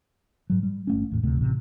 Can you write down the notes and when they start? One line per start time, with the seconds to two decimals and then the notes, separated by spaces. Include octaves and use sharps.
0.50 G#2 F#3
0.63 G3
0.87 G1 A3 C#4
1.11 E2 A2
1.23 D2 C3 A3
1.37 A1 C3